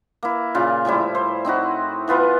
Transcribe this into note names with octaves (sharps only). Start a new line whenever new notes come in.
A#3 E4
A#2 C#3 F4
A2 F3 G3 E4
C5
C4 D#4 E4 F#4
E3 B3 F4 B4